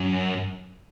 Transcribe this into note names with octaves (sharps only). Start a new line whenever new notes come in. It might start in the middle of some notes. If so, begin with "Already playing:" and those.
Already playing: F#2